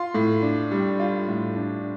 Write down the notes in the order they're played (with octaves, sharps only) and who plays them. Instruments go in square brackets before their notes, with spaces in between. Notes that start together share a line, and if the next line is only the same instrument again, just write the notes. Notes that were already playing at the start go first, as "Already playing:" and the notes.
Already playing: [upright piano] F4 C6
A2
D4
G3
F4
A2
D4